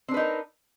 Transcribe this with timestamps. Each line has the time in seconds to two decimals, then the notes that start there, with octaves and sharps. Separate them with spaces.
0.08 C4
0.11 D4
0.14 B4
0.17 D#4
0.19 A#4